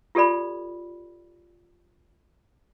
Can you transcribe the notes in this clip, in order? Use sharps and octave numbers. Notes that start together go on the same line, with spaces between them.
F4 G4 A4 D5 B5